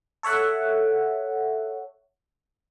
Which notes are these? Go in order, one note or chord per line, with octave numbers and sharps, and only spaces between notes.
A4 C#5 E5 F#5